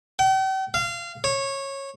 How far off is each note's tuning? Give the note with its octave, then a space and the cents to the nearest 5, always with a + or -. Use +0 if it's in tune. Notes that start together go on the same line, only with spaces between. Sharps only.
G5 -45
F5 -25
C#5 -20